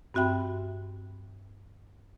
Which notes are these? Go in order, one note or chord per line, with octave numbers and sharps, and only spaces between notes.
G2 C4 F#4 E5 G5 B5